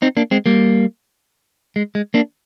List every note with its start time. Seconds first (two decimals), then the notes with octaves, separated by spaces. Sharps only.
0.02 C4 D#4
0.17 A#3 D4
0.31 G#3 C4
0.46 G3 A#3
1.76 G#3
1.95 G#3
2.14 A#3 D4